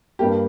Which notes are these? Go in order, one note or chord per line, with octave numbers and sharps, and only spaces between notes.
G2 G3 A#3 G4